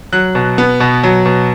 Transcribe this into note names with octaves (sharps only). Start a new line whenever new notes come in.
F#3 F#6
B2
B3
B2
F#3
B2